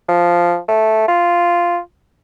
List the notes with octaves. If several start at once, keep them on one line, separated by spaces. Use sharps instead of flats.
F3
A3
F4